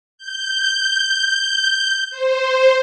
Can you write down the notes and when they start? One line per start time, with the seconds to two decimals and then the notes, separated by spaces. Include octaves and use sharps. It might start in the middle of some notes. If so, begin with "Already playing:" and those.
0.18 G6
2.11 C5